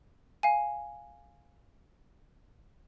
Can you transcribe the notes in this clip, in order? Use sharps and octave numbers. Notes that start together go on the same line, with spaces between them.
F5 G#5